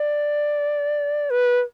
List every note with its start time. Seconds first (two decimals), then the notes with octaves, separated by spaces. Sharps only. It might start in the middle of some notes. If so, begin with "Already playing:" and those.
Already playing: D5
1.30 B4